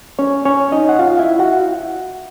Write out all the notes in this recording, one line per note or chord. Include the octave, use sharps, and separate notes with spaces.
C#4 C#5
C#4 C#5
D#4 D#5
F#5
F4 F5
E4 E5
F#4 F#5